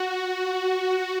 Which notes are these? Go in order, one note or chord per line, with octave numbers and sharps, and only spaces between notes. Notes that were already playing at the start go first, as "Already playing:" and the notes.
Already playing: F#4